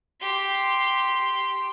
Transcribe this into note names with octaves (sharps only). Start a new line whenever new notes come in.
G4 C6